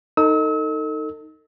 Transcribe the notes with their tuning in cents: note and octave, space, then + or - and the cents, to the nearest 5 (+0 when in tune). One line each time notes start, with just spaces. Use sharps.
D#4 +0 A4 +35 E6 -40